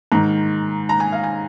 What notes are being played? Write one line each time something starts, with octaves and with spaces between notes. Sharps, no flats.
G#2 D#3 A#5
A#5
G#5
F5
G#5